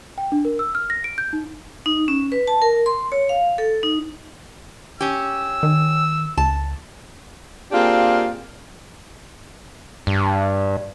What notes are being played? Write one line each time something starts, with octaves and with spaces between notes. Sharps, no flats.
G5
D4
A#4
E6
F6
A#6
D7
G6
D#4
D#4
C#4
B4
A5
A#4
C6
C#5
F5
A4
D#4
C#4 G4 E6
D#3
C#2 A5
A#3 C4 D4 F4 G4 G#4
G2